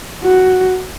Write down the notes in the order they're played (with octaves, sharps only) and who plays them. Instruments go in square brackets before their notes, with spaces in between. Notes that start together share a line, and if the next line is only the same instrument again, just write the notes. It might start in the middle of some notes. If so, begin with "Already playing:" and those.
[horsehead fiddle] F#4